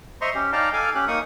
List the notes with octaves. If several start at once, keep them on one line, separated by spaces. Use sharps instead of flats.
C5 D#5 E5 A#5 C6 C#6
C#4 G4
D#4 D5 F5 G5 A5 A#5
A4 F5 G#5 D6
C#4 G4 F#6
A#3 D#4 C#6 D#6